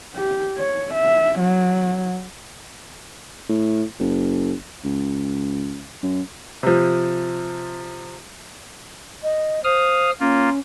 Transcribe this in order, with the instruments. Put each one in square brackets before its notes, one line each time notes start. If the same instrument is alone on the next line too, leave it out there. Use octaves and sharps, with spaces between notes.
[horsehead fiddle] G4
C#5
E5
F#3
[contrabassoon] A2
F#1
C#2
F#2
[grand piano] C3 F3
[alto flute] D#5
[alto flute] C5 [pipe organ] F5 D#6 F6
[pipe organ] A#3 F4 [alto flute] C#4